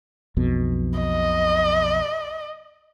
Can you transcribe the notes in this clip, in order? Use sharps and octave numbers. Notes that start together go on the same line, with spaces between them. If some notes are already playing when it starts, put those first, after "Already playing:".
B1 F2 B2
D#5